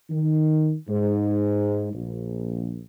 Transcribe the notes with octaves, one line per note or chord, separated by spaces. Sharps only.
D#3
G#2
A#1